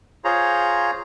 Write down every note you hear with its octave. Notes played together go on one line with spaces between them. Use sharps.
F4 G#4 C5 C#5 A#5